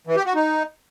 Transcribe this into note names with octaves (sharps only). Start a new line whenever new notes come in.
E3
G4
F#4
D#4